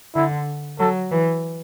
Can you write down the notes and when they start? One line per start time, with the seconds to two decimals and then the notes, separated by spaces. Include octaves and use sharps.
0.15 D3 E4
0.79 F#3 A4
1.11 E3